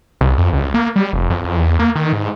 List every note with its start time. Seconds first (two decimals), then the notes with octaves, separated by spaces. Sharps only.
0.21 C2
0.38 F2
0.53 C#2
0.74 A#3
0.96 G3
1.13 F1
1.30 F2
1.45 F2
1.58 E2
1.79 A#3
1.95 D#3
2.13 G#2